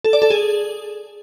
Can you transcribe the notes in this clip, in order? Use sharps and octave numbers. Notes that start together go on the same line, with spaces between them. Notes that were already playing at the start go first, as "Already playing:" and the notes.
A4
D5
A4
G#4